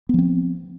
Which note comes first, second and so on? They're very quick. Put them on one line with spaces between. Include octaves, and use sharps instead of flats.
B3 F3 C4